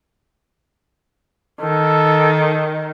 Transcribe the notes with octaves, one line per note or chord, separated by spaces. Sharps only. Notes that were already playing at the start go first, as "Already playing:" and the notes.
D#3 A4